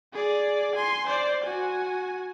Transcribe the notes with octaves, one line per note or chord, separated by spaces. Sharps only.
G#4 D5
G#5 C6
C5 D5
F#4 G#5